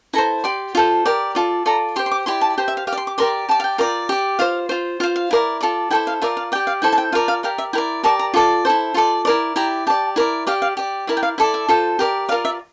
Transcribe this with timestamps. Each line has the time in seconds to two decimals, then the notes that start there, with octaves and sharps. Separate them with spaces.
0.13 E4 A4 C5 A#5
0.44 G4 D5 C6
0.75 F4 A4 C5
1.06 G4 A#4 D5
1.35 F4 A4 D5
1.66 F4 A4 D5 A#5
1.96 G4 C5 C6
2.06 C6
2.12 D6
2.26 E4 G4 D5 C6
2.41 A5
2.58 G4 C5 G5
2.68 E5
2.77 F5
2.87 G4 F5
2.93 D5
2.97 C6
3.07 D6
3.18 G4 A#4 D5 C6
3.49 G4 D5 A5
3.60 F5
3.64 G5
3.78 F4 A#4 D5
4.09 G4 D5
4.39 F4 C5 F5
4.69 F4 C5
5.00 F4 F5
5.03 C5
5.16 F5
5.31 E4 A#4 D5
5.61 F4 A4 D5
5.91 E4 A4 C5 G5
6.07 F5
6.22 F4 A#4 D5 E5
6.37 F5
6.52 D5 G5
6.55 G4
6.67 F5
6.82 E4 A4 C5 G5
6.93 A5
6.98 G5
7.12 F4 A#4 D5 F5
7.28 F5
7.43 G4 A#4 D5 F5
7.58 E5
7.73 E4 A#4 D5 G5
8.04 G4 A#4 D5 A5
8.19 A#5
8.34 F4 A4 D5 D6
8.65 E4 A4 C5
8.94 F4 A4 D5 C6
9.25 E4 A#4 D5
9.56 E4 G4 D5 A#5
9.87 G4 D5 A5
10.16 E4 A#4 D5
10.47 G4 D5 F5
10.62 F5
10.77 G4 D5
11.07 E4 A#4 D5 E5
11.17 G5
11.23 F5
11.38 E4 A4 D5 E5
11.54 E5
11.69 F4 A4 C5
11.99 G4 A#4 D5
12.29 F4 A#4 D5 F5
12.45 E5